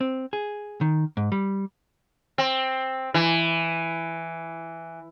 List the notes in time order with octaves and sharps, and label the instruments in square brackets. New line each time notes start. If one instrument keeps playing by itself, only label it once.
[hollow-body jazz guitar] C4
G#4
D#3
G#2
G3
[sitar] C4
E3